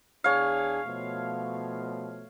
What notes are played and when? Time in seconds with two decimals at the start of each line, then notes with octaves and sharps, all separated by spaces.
0.24 E2 D4 G#4 C#5 F5
0.86 B2 F3 A3